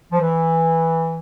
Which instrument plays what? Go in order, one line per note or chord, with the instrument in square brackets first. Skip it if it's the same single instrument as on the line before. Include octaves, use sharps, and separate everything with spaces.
[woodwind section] F3
E3